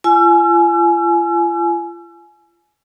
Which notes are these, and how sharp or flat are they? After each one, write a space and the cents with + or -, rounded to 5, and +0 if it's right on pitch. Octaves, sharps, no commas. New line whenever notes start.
F4 -35 G#5 +25 E6 +40